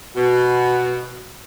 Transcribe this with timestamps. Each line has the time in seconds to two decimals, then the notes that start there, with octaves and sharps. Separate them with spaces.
0.16 B2